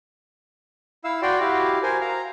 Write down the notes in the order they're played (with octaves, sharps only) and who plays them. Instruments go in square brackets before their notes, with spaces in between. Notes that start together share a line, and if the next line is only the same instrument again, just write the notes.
[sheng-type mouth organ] E4 F5 E6
F#4 D5 G5 C6
E4 F#4 G4 F5
A#4 C5 G#5
F5 A#5